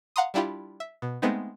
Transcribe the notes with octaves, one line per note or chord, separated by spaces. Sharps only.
F5 F#5 A#5 C6 D#6
G3 D4 E4 F4 G4
E5
B2
G#3 A3 B3 C4 D#4